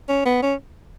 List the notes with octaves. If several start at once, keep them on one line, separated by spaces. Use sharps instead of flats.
C#4
B3
C#4